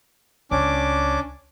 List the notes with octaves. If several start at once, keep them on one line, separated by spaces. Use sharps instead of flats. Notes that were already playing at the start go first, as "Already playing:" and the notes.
C#2 C#4 D4 D6